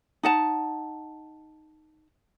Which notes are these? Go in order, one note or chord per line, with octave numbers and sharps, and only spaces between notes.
D#4 F#5 A5